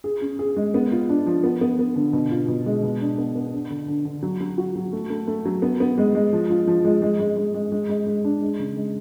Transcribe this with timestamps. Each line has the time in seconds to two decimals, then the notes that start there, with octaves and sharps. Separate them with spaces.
0.04 G#4
0.21 C#4
0.39 G#4
0.57 G#3
0.74 B3
0.92 F4
1.09 D4
1.26 F3
1.44 B3
1.61 B3
1.79 B3
1.96 D3
2.13 B2
2.31 F4
2.48 B2
2.66 G#3
2.83 B2
3.01 D4
3.18 B3
3.35 B3
3.53 D4
3.70 D3
3.88 D3
4.05 D3
4.23 F#3
4.41 F#3
4.58 F#4
4.75 F#3
4.93 A3
5.10 A3
5.28 A3
5.45 F#3
5.62 B3
5.80 B3
5.98 G#3
6.15 G#3
6.33 F3
6.50 F4
6.67 F3
6.85 G#3
7.02 G#3
7.20 G#3
7.37 G#3
7.54 G#3
7.72 G#3
7.89 G#3
8.07 G#3
8.24 D4
8.41 G#3
8.59 C#3
8.76 G#3